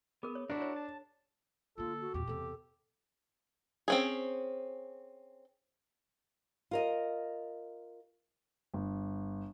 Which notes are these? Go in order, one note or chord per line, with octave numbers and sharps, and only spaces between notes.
B3 G#4 A#4
C#5
D4 E4 F#4 A#4
C#5
A5
D3 A#3 F4 A4
F#4
E2 A#2 G4
E2 C3 A4
C4 C#4 G#4
F4 A#4 D#5
G1